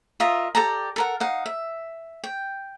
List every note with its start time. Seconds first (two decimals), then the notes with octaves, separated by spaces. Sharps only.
0.20 F4 A#4 D#5 E5
0.55 G4 A4 D5 A#5
0.96 A4 A#4 F#5
1.20 D#4 F5 F#5
1.46 E5
2.24 G5